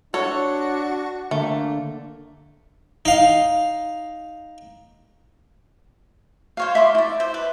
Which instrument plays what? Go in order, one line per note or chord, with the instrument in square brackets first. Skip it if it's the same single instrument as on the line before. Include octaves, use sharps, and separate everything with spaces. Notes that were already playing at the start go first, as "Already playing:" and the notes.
[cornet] D4 [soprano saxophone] F#4 [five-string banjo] A4 C#5
[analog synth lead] D3 [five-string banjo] A3 [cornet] A#3
[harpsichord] D#4 F5
[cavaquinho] C5 C#5 F5
E5 B5 C6 D6
E4 D5
C5 E5
B4